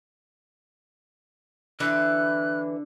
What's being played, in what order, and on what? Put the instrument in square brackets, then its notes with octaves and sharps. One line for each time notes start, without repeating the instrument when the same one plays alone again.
[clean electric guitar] D3 [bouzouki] E3 B4 E5 [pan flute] F#6